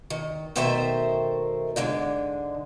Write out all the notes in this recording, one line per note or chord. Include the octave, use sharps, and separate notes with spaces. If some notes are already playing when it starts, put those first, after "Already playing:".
D#3
B2 D#3 A3 A#4 C5 E5
G#2 D3 G#3 D4